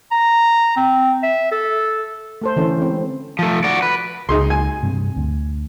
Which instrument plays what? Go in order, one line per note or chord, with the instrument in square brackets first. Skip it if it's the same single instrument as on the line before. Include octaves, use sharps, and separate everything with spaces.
[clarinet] A#5
C4
E5
A4
[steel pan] A3 A4 C5
D3 E3 C#4 A4
E3 G#3 C4
[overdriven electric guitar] F3 A3
F#4 D5
B4
[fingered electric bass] C#2 [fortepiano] D#4 G#4 C6
[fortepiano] G#5
[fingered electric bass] G2 C3
D2